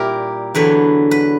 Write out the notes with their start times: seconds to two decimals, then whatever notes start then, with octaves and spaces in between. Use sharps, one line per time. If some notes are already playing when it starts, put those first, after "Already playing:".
Already playing: A#2 G3 E4 G4 A#4
0.55 E2 D3 F#3 B4
1.11 B4